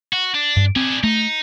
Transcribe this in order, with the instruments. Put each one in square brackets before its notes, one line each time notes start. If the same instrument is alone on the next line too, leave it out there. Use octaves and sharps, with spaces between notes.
[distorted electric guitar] F#4
D4
[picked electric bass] G2
[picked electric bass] C4 [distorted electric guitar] D4 G#4
[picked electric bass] A3 [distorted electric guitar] D#4